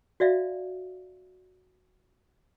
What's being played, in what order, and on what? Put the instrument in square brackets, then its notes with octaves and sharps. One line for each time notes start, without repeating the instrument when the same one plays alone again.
[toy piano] F#4 D5 E5 F5